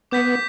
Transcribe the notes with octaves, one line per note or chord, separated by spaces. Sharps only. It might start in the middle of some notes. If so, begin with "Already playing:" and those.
B3 D6 G6 B6